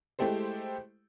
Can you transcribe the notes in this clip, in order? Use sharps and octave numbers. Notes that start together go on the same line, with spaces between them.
G#3 A3 E4 G4 A4 C5